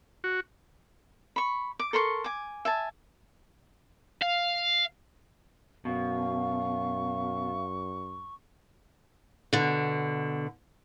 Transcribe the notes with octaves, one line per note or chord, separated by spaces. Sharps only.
F#4
B5 C#6
D6
A4 A#4 C6 C#6
G#5 D6
E5 G#5 A5
F5
F#2 B2 F5 C#6
B2 D3